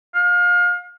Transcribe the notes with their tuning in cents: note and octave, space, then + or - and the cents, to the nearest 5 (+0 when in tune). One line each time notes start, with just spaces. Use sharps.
F5 +30